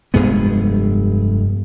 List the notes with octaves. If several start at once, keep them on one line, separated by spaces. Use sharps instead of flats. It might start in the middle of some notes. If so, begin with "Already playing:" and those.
F1 G2 G#3 B3